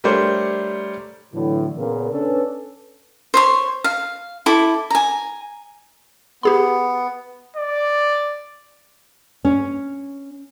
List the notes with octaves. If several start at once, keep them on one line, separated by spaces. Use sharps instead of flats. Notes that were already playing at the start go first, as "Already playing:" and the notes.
G3 A3 D4 A#4 C5 C#5
A2 D3 E3 F#3
A#2 C#3 B3 A#4
C#4 D4 A4 B4
C5 C#5 C6
F5
E4 A4 D6
G#5 A#5
B3 G4 G#4 B5
D5
C#4